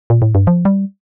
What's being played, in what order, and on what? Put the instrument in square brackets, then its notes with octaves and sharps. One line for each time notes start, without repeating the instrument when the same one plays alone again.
[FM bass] A#2
A2
G2
F3
G3